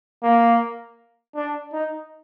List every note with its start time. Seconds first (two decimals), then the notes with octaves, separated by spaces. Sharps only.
0.23 A#3
1.35 D4
1.73 D#4